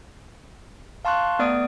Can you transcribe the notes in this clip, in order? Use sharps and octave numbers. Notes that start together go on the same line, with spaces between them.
F5 A5 C6 C#6 F#6
A3 B3 D5 D#6 D7